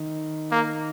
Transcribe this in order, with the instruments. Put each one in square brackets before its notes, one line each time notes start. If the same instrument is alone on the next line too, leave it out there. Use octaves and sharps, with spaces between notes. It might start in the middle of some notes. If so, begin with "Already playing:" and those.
Already playing: [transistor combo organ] D#3
[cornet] A#3